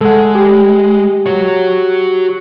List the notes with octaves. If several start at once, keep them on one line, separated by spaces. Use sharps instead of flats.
G#3 A4 F#5
G4
F#4 C#5